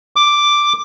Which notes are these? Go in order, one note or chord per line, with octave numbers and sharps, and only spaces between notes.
D6